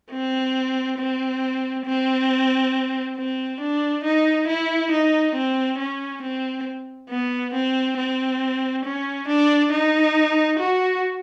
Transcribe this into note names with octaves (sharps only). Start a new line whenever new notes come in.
C4
C4
C4
C4
D4
D#4
E4
D#4
C4
C#4
C4
B3
C4
C4
C#4
D4
D#4
F#4